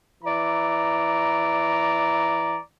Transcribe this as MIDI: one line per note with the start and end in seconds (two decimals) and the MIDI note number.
0.24 2.59 52
0.24 2.59 74
0.24 2.59 82